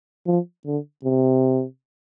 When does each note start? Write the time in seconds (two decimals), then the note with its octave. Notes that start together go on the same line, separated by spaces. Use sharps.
0.26 F3
0.66 D3
1.05 C3